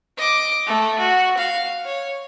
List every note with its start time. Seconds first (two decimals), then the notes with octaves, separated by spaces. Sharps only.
0.17 D#5 D6
0.67 A3
0.99 F#4
1.37 F5
1.85 C#5